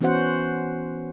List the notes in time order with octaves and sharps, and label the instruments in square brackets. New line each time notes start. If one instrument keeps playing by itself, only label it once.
[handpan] E3 B3 C#4 F#4 C5 F#5